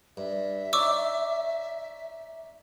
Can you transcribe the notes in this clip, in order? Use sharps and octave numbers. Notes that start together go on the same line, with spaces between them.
G2 E5
D#4 C#5 D5 C#6 D6 E6